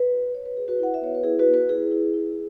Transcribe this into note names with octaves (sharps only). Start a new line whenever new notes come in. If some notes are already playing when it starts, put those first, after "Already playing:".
Already playing: B4
F#4
F#4 C#5
B4
F#4 G#4
F#4 B4
E4 F#5
E5
B3 C#5
B4
E4 G#4
F#4 B4
B3
F#4 B4
E4 G#4
E4
E4